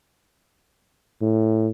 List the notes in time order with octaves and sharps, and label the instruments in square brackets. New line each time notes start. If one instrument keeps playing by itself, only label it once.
[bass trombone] A2